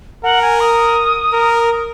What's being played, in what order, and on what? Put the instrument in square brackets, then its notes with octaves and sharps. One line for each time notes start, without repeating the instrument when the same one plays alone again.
[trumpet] A#4 [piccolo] F#5
[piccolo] G#5
D#6
[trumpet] A#4